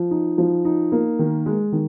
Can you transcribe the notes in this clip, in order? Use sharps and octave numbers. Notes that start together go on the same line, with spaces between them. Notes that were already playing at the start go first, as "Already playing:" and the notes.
Already playing: F3
D#4
F3
D#4
A#3
D#3
G#3
D#3